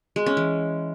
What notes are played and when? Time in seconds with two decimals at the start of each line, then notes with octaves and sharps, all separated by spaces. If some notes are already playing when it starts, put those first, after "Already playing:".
0.16 G#3
0.26 C#4
0.37 E3